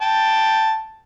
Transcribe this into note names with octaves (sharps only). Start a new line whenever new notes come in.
G5 A5